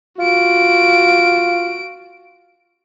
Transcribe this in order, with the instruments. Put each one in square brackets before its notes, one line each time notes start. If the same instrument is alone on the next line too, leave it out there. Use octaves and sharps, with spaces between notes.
[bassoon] F4 [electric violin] F#4 D7